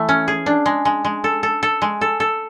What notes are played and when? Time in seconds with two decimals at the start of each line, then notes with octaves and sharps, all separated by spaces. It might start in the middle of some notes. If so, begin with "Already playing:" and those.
Already playing: E3 A3
0.09 C#4
0.28 G#4
0.46 D4
0.66 G#3
0.85 G#3
1.05 G#3
1.24 A4
1.43 A4
1.63 A4
1.82 G#3
2.01 A4
2.20 A4